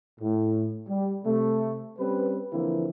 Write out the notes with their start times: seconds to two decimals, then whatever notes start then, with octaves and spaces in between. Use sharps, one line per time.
0.21 A2
0.88 G3
1.25 C3 A3
1.98 G3 C4 C#4 B4
2.53 D3 E3 F3 A#3 C4 E4